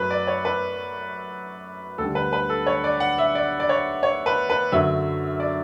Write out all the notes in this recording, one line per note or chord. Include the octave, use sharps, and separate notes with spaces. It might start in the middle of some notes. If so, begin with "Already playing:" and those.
Already playing: F#2 F#3 A3 B4
D5
C#5
B4
D2 D3 G3 A4
B4
B4
A4
C#5
D5
F#5
E5
D5
D5
C#5
C#5
B4
B4
F#2 D3 F#3 A3 E5
D5